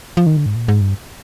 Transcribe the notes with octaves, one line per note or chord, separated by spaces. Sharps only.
F3
D#3
D3
G#2
A#2
G#2
G2